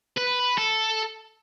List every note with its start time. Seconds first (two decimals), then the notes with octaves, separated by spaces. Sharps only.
0.18 B4
0.58 A4